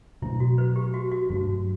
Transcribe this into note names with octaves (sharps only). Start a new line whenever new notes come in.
B2 F#3 A3 D4 E4
F#4
B4
G4
F#4
F#4
G2 F#3 A3 D4 F#4